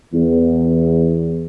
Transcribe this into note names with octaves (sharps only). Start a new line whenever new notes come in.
E2